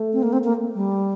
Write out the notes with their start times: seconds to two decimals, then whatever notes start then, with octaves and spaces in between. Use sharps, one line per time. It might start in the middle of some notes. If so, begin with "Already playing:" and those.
Already playing: A3
0.13 C4
0.23 A#3
0.33 C4
0.44 A#3
0.75 G3